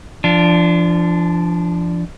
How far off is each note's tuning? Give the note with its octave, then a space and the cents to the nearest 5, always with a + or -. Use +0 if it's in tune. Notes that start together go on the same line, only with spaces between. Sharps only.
F3 -30 D4 +0